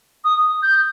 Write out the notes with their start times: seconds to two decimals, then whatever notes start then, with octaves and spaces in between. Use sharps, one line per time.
0.24 D#6
0.63 G6